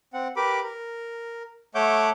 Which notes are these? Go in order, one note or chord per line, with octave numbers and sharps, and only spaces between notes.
C4 F#5
G4 A#4 B4 B5 D6
A#4
A3 C#5 E5 F#5 D6 G6